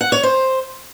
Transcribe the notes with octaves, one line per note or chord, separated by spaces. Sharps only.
F#5
C#5
C5